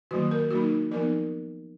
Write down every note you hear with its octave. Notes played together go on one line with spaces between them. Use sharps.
D#3 F#3 A#3 F#4
A#4
F#3 A#3 D#4 F#4
F3 B3 D#4 A#4